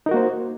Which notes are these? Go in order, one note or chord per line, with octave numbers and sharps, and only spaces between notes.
A#3 D#4 F#4 A#4 C5